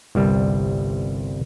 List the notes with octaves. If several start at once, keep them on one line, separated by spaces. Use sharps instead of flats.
G1 C2 G3